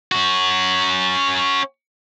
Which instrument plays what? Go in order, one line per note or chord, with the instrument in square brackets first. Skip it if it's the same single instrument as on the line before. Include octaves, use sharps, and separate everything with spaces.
[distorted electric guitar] C#4 F#4